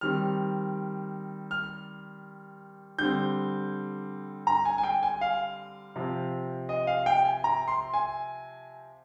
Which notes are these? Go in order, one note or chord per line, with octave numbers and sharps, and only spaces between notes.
D#3 G3 C4 F6
F6
D3 G3 C4 G6
A#5
G#5
G#5
G5
G#5
F5
C3 F3 C4
D#5
F5
G5
G#5
A#5
C6
G#5